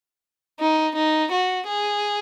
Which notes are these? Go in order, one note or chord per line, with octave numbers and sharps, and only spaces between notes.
D#4
D#4
F#4
G#4